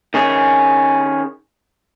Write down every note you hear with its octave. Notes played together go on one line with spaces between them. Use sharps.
D#3 C#4 G#4